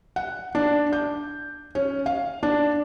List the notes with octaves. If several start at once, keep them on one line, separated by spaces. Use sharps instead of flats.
F#5
D4
G6
C#4
F5
D4